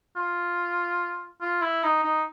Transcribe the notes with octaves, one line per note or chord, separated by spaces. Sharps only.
F4
F4
E4
D#4
D#4